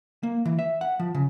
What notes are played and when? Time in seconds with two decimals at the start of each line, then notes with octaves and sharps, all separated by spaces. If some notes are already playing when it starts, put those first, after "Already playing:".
0.23 A#3
0.45 E3
0.59 E5
0.81 F#5
0.99 F3
1.14 C#3